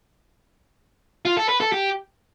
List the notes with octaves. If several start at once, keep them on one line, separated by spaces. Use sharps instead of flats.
F4
A4
B4
A4
G4